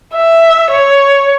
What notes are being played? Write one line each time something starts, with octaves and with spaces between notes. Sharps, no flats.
E5
C#5